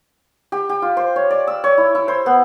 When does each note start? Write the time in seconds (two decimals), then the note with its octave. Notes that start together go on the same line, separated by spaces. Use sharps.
0.52 G4
0.69 G4
0.82 F4
0.97 C5
1.16 C#5
1.30 D5
1.47 E6
1.64 C#5
1.78 E4
1.95 E4
2.08 C5
2.26 B3